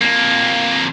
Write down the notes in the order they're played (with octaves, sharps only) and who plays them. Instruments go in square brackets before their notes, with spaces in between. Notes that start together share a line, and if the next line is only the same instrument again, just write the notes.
[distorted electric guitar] F2 A#3